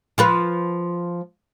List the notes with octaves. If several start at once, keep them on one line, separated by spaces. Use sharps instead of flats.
F3 F4 B4